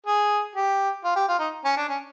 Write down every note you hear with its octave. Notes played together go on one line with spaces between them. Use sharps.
G#4
G4
F4
G4
F4
D#4
C#4
D4
C#4